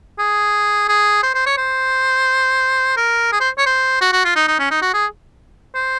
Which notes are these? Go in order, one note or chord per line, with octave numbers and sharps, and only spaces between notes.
G#4
G#4
C5
C5
C#5
C5
A#4
G#4
C5
C#5
C5
F#4
F#4
F4
D#4
D#4
C#4
D#4
F#4
G#4
C5